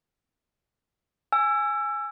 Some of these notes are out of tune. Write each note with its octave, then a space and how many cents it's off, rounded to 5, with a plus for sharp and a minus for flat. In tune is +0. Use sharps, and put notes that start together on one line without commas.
G#5 +0 E6 +25